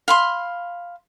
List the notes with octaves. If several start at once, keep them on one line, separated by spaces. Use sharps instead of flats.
F5 B5 C6